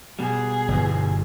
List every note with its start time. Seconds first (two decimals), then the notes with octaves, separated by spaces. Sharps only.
0.19 B2 G3 G#4
0.68 G1 E2